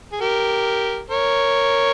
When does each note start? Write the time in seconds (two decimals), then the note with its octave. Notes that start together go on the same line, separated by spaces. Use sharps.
0.12 G#4
0.21 G4 A#4
1.10 A#4 C#5